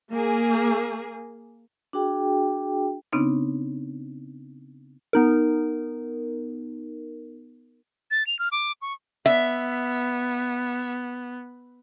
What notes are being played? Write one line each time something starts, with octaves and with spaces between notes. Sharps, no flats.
A#3 G#4
D4 F#4 G#4 G5
C#3 B3 C4 D4 D#4
B3 D#4 A#4
A6
F7
F6
D6
C#6
B3 E5